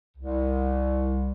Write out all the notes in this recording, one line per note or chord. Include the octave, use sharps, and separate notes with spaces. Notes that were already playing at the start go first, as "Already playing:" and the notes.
C2